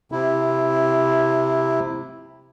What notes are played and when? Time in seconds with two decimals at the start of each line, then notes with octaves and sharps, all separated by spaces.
0.12 C3 E4